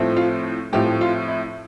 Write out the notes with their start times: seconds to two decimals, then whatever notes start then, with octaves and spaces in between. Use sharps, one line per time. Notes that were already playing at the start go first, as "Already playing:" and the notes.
Already playing: A2 F3 A3 C4
0.17 F4
0.72 A2 F3 A3 C4 G4
1.01 F4
1.28 E4